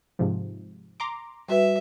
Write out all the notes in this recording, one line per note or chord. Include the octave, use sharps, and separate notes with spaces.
G#2 C3 F3
A#5 C6 D6
G3 F#4 B4 E5